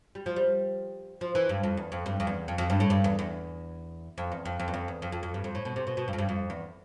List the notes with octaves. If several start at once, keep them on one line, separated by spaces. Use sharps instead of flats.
G3
F3
G3
F3
E3
G2
F2
E2
F2
G2
F2
E2
F2
F2
G2
A2
G2
E2
E2
F2
E2
F2
F2
E2
F2
E2
F2
F2
F2
G2
F2
A2
B2
C3
B2
B2
G2
F2
G2
F2
E2